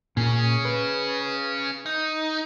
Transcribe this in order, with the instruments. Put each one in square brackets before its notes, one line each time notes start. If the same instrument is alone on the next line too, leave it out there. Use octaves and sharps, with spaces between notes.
[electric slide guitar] A#2 [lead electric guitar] C#4 G#4
[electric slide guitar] B4
[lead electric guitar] D#4